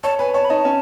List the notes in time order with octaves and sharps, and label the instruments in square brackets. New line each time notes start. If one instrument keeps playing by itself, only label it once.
[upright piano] C#5 [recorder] A5
[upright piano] B4 [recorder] G#5
[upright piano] C#5 [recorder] A5
[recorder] B5
[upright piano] D#4 [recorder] A5
[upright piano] C#4